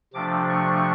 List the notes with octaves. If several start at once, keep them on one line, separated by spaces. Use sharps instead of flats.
C3 F3 A3 D4 D6
C#6